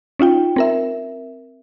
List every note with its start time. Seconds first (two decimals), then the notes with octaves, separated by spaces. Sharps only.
0.19 C#4 D#4 F4 G5
0.56 C4 A#4 E5